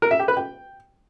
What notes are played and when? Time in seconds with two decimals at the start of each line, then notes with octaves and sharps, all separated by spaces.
0.02 A#4
0.11 E5
0.19 G4
0.28 B4
0.37 G5